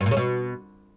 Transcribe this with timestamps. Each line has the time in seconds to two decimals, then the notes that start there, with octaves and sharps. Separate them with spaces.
0.01 G2
0.06 A#2
0.11 C#3
0.17 B2